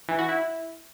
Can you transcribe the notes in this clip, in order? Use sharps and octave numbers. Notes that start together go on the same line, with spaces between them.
E3
F#4
E4